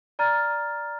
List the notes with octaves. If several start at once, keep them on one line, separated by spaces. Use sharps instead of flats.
D5 A#5 F6 A6